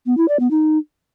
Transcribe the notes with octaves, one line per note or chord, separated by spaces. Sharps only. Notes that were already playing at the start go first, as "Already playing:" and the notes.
B3
E4
D5
B3
D#4